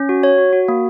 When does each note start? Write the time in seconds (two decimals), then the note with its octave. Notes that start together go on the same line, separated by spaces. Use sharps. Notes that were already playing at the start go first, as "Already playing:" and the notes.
Already playing: C#4
0.09 F#4
0.23 F#4 C#5
0.38 F#4
0.53 F#4
0.68 A#3